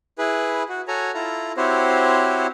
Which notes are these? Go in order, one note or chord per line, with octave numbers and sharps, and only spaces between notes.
E4 G#4 B4
F#4
F#4 A4 C#5 G#5 A#5
E4 F4 A4 A#5
C4 E4 F#4 G4 C5 C#5